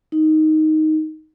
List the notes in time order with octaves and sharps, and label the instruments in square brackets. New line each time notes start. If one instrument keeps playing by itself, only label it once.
[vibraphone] D#4